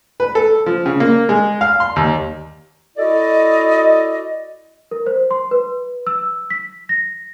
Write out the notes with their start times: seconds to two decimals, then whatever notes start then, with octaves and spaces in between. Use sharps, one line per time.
0.20 B4
0.35 A4
0.66 F3
0.86 C#3
1.00 A#3
1.29 G#3
1.61 F5
1.80 C6
1.96 D#2
2.95 E4 F#4 A4 D5 D#5
4.91 A#4
5.07 C5
5.31 C6
5.51 B4
6.07 E6
6.50 B6
6.89 A#6